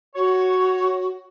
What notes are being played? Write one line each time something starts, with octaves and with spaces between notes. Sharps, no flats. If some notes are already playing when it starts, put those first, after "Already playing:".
F#4 C#5